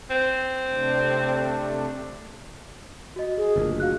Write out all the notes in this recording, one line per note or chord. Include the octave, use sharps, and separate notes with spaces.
C4
C3 A3 D4
F#4 D#5
G#4
F#1 D2 A#2
F#4 F5 F#6